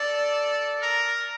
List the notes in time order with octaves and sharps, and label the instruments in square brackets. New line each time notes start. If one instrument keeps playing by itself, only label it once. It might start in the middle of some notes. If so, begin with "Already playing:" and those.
Already playing: [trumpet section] A4 [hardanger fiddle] D5
[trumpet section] A#4